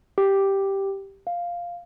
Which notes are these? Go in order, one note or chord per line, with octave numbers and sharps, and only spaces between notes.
G4
F5